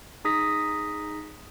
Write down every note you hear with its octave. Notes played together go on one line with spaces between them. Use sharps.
D#4 G#4 D#6 A#6 B6